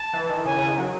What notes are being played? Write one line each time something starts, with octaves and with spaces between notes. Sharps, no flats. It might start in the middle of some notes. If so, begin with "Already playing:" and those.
Already playing: A5
E3
D#3
C#3 G#5
C#3
D#3
F#3